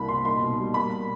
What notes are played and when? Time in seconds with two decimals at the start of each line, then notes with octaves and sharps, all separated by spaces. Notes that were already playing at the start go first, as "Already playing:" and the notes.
Already playing: C2 A#3 B5
0.08 A#2 C6
0.25 D#4 C6
0.42 B2
0.58 G3
0.74 A#3 B5